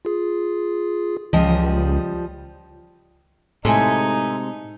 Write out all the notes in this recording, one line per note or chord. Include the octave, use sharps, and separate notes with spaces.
F4 G#4
C#2 F3 G3 D#5
A2 C3 G#3 D#4 A4 E5 G#5